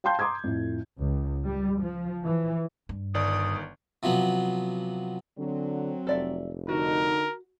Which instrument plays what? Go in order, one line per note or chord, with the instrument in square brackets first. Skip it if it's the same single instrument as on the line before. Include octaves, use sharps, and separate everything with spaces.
[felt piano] F5 G5 A5 C6 G6
A#5 C6 D6 D#6 G#6
F2 A2
[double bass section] C#2
G3
F3
E3
[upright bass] G2
[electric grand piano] G1 D#3 D5 [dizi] D#6
[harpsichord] C3 F3 F#3 B3
[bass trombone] D3 [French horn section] F#3 C4
[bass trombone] F1 [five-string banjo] A4 D5 E5
[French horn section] D3 D#4 [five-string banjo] F#4 [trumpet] A#4